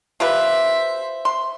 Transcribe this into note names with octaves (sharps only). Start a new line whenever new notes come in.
F4 G4 B4 C5 E5
C6